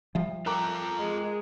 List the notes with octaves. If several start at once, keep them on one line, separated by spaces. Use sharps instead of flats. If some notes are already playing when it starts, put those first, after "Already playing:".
F3 G3 E5
F4 A4 A#4 G5 A#5 D6
G#3